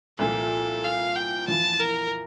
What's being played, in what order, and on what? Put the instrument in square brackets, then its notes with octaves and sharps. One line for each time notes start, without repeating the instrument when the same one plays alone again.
[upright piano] C2 A#2 F3 [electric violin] A4
[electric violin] F5
G5
[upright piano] F2 E3 A#3 E4 [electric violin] A5
[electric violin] A#4